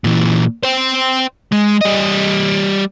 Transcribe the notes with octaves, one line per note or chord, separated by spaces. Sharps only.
A#2 E3
C5 G5
G#3
G3 D#5